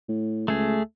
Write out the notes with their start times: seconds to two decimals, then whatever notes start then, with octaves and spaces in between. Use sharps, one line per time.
0.09 A2
0.48 C#2 A3 G#4